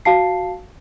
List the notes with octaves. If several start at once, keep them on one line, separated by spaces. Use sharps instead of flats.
F#4 F5 A5 C7